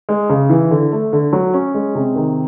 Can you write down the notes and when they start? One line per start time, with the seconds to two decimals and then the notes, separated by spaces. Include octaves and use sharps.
0.09 G#3
0.30 C#3
0.50 E3
0.71 D3
0.92 A3
1.13 D3
1.33 F#3
1.54 C#4
1.74 G#3
1.95 C3
2.16 D#3